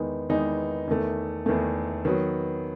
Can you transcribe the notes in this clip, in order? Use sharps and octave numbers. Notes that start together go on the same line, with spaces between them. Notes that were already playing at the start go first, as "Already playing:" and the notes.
Already playing: E2 D#3 G#3 B3 D#4
E2 D#3 G#3 B3 D#4
E2 D#3 A3
E2 D#3 A3
D#3 F#3 B3